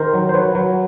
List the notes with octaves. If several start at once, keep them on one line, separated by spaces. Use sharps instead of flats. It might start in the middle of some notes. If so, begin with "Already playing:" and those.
Already playing: D#3 A#4 C5
F#3
C5
F#3 B4 C#5
F#3